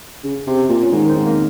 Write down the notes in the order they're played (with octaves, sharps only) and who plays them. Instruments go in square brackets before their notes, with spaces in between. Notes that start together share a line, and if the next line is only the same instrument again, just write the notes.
[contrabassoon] C#3
C3
A#2
[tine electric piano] C#4
[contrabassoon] G#2 [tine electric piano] D#3 D#4
[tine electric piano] A#4
C4 C5
[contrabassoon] G#2
[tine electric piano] A#3 A#4